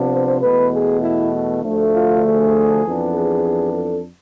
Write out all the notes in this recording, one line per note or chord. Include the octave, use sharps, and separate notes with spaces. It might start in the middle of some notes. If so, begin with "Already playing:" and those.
Already playing: C3 F3 B3 D4
C5
E2 B2 A3 B4
G#4
E4
D2 D3 F3 A3
F4
G#4
F2 E3 B3 D4
G#4
A4